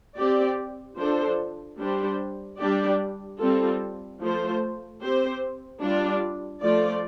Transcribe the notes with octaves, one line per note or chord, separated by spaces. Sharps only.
C4 G4 D5
F3 D4 A4 C5
G3 D4 G4 C5
G3 D4 G4 D5
G3 C4 F4 A4
F3 A3 F4 C5
C4 G4 C5
G3 D4 F4 D5
F3 A3 F4 D5